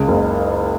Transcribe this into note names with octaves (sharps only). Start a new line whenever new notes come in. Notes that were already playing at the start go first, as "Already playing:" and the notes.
Already playing: C#2 C#3 A#3
F#1
D#3